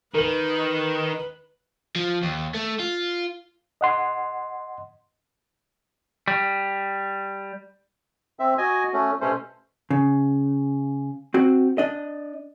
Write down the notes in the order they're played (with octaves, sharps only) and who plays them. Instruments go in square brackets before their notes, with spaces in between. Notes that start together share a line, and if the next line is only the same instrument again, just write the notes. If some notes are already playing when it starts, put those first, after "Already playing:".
[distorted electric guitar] D#3 [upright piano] A#4 F#7 [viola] B4
[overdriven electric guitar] F3
D#2
A3
F4
[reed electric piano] D#5 F#5 C6
[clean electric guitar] G3
[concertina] C4 E5
[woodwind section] F#4 [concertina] D#5 G#5
[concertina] A3 C#4
[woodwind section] G2 B2 C#4 [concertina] A3 C5
[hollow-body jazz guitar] C#3
C4 F#4
D4 D#5